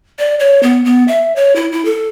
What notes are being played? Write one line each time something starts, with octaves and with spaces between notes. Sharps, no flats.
D5
C#5
B3
B3
E5
C#5
E4
E4
A4